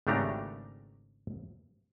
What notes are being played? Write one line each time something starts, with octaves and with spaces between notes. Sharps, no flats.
G#1 C#3 A3 D4 G4 A#5